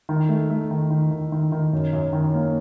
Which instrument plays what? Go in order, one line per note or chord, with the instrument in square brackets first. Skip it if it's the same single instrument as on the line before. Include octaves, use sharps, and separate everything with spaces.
[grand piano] D#3
A3
A3
D#3
D#3
D#3
D#3
D#3
F#2
F#2
D#3
A#3